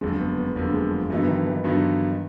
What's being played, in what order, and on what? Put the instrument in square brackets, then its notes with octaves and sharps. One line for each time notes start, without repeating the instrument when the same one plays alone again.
[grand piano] F#1 F2 D3 [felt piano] G#3
[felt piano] B3
B3
[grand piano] F#1 F2 D3 [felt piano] A#3
[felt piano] G#3
F3
[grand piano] G2 D3 F#3 B3 D#4 [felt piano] E3
[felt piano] E3
D#3
E3
[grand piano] G2 D3 F#3 B3 D#4